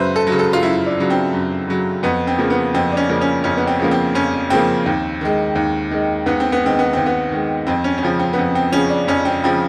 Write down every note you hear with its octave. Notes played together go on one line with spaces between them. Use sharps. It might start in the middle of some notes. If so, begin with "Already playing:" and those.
Already playing: F#2 C#3 F#3 B4 C5 E5
A4
F#3
C#3
A4
F4
F#2 E4
D4
C#3 F#3
C4
F#2
C#3 F#3
F2 B3
C4
C#3 F3 A#3
B3
F2 C4
D4
C#4
C#3 F3 A#3
C#4
F2 C#4
B3
C4
C#3 F3 A#3
C4
F2 C#4
C#3 F3 A#3 C4
D#2
D#3 G#3
D#2
D#3 G#3
D#2 B3
C4
B3
D#3 G#3 C4
B3
D#2 C4
B3
D#3 G#3
F2 C4
C#4
C#4
C#3 F3 C4
C4
B3
F2 C4
C4
C#3 F3 C#4
D4
F2 C#4
C4
C#3 F3 C4